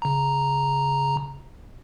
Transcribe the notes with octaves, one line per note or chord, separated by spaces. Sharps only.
C#3 A#5